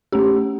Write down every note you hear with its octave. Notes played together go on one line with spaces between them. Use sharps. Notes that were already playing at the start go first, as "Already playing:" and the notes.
A3 C#4 G4